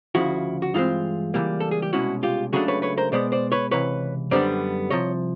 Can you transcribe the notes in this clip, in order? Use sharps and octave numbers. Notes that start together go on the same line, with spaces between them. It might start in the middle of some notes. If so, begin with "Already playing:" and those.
D2 C#3 F3 E4 F#4
F#4
G2 E3 G#3 C4 D#4 F4
C#2 C3 E3 G3 A#3
A4
G#4
G4
C2 B2 G#3 C#4 E4 F#4
F4 G4
C#2 C#3 F#3 A3 D4 F#4 G#4
B4 C#5
B4 C#5
A#4 C5
B2 G#3 B3 C5 D5
C5 D5
B4 C#5
C#2 C3 E3 B4 C#5
F#2 D3 G3 B3 D4 C5 D5
C2 C3 F3 C#5 D#5